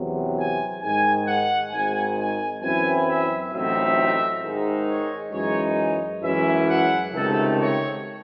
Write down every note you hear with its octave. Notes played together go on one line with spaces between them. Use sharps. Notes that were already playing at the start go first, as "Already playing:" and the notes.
Already playing: E2 C3 F#3
G#5
G#2 D#3 G#3 G#5
F#5
G#1 G#2 D#3 G#5
G#5
F#2 E3 C4 E4 G#5
E5
A1 A2 F#3 C4 D#4 E5
G#2 D#3 G#3 D#4
C#5
F#2 E3 G#3 D#4 C#5
F#2 E3 G#3 C#4 E4 E5
F#5
C#2 C3 D#3 A3 D#4 A4
C#5